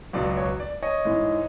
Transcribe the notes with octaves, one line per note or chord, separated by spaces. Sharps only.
C#2 B2 F#3 D5
C#5
D5
C#5 D#5
G#2 E3 G#3